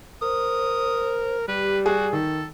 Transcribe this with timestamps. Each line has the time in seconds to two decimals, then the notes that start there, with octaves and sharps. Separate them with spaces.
0.22 A#4 C5 D#6
1.48 G3 G4 B4
1.86 F#4 G#4
2.13 D#3 A4